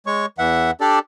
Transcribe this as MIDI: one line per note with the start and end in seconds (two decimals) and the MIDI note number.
0.06 0.26 56
0.06 0.26 73
0.06 0.26 85
0.38 0.71 40
0.38 0.71 52
0.38 0.71 76
0.38 0.71 78
0.81 0.99 62
0.81 0.99 67
0.81 0.99 69
0.81 0.99 74